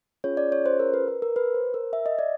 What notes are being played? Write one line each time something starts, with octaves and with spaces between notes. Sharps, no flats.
C#4 F4 G#4 C#5
D5
C#5
C5
A#4
B4
B4
A#4
B4
C5
A#4
E5
D#5
D5